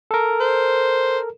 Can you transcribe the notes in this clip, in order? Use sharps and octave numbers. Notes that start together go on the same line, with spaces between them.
A4 A#4
C5